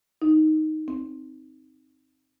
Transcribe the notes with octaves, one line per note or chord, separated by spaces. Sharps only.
D#4
C4